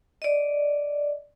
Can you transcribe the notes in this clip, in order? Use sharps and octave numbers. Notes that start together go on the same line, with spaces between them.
D5 D#5